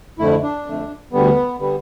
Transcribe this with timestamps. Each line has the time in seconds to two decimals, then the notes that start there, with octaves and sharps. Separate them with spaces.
0.19 F2 D3 A3 E4
0.43 D4
0.66 F2 D3 A3
1.13 D2 D3 G3 B3
1.59 D3 G3 B3